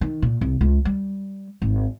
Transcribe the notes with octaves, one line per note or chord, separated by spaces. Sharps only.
D#3
A#2
C2
C#2
G3
G#1